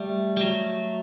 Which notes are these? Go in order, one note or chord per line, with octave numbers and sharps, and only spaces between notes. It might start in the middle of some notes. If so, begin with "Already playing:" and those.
Already playing: G3 A3
G3
F#3